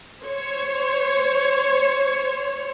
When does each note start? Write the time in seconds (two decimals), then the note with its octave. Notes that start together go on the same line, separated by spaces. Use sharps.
0.23 C5 C#5